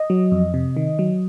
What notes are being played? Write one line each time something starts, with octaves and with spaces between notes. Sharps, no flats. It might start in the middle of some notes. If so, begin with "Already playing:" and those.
Already playing: D#5
F#3
F2
C3
D#3
F#3